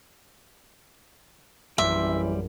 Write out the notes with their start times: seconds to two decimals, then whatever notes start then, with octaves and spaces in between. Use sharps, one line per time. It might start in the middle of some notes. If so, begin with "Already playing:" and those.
1.78 A#1 F#2 E3 G3 E5 C6 D6